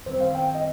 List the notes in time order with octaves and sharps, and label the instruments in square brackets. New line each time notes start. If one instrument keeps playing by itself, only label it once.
[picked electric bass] F#2 D#3 G3 C4 [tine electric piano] C5
[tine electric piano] F5
G5
D#5